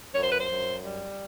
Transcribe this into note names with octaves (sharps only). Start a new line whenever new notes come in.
F#2 C#5
C5
B4
C5
F#2
G3